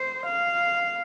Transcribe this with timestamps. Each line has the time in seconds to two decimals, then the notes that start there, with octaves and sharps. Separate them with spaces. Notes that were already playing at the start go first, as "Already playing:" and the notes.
Already playing: C5
0.26 F5